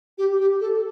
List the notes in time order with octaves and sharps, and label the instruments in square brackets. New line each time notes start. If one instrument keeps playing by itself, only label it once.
[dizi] G4
G4
A4